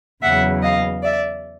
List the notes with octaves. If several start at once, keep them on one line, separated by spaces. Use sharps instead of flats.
E2 C#3 F#3 E5 F#5
D#5 F5
D5 E5